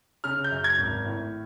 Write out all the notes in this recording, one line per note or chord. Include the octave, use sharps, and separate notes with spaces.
C#3 F6
G6
F#2
G#6
G#1
A2